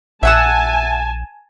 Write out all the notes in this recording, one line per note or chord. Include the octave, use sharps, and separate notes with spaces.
A#1 E5 F#5 G#5 A5 E6